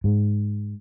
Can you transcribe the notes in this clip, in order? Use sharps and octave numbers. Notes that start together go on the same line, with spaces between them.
G#2